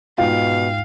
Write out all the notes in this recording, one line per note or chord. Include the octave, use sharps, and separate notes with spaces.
G#2 B2 F4 F5 G5